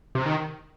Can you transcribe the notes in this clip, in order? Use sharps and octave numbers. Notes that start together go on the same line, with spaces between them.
C3
D#3